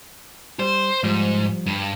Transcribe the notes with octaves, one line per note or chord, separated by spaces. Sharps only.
G3 C5
G#2 F3 G3
G2